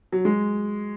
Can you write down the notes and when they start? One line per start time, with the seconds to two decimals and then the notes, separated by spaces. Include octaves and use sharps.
0.12 F#3
0.25 G#3